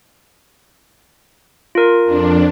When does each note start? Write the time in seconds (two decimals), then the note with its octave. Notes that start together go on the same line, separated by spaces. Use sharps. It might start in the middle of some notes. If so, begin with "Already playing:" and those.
1.75 F4 A#4
2.05 F2 D4